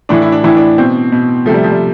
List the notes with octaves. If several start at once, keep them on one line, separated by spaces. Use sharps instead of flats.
A2 E3 D4
E4
D4
A2 E3 E4
D4
B2 C4
B2
C3 F3 A3
G3
F3
G3